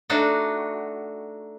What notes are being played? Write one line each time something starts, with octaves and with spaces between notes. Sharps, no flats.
A3 D4 D#4 F#4